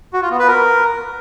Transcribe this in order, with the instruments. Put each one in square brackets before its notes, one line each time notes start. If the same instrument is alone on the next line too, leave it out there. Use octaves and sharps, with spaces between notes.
[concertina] F#4
F4
B3
B4
A#4